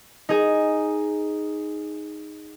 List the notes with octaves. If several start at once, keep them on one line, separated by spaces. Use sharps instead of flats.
D#4 G#4